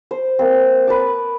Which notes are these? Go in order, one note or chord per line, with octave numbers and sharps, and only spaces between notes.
C5
A#3 C4
B4 A5 D6